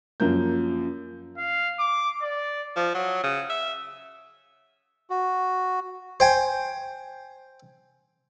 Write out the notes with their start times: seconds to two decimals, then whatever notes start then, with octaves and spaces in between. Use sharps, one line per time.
0.20 F#2 F3 A#3 G6
1.37 F5
1.79 D6
2.22 D5
2.76 F3
2.95 F#3
3.24 C#3
3.50 E5
5.10 F#4
6.20 C5 G5 G#5